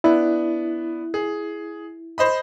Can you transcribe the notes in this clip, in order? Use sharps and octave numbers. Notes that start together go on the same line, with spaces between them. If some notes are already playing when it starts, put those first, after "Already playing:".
B3 D4 E4
G#4
C5 D#5 B5